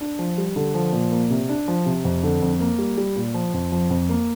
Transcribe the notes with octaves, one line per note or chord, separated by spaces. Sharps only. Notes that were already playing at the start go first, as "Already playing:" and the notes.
D4
F3
G3
D3
F3
A#2
A#3
C3
D4
F3
C3
F2
D3
F2
A#3
G3
G3
A#2
F3
F2
F3
F2
A#3